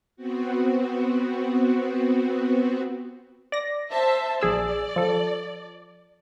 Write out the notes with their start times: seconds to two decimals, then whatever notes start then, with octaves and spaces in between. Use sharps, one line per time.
0.17 B3 C4 F#4
3.52 D5 A#6
3.89 C5 E5 A5
4.41 A#1 G#4 D5 E6
4.96 F3 A4